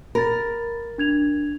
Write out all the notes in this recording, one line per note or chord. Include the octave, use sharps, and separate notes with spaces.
A#4 B5 A6
D4 G#6 F7